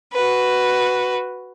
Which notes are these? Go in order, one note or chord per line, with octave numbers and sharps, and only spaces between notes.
F#4 B4